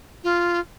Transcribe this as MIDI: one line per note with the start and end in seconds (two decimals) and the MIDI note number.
0.24 0.60 65